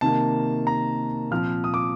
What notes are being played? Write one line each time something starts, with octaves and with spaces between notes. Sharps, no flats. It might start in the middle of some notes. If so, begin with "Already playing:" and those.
C3 D#3 A#3 A5
A#5
A#2 F3 C4 F6
D#6
D6